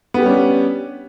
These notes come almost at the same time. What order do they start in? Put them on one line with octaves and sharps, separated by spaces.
B3 G4 G3 C#4 D4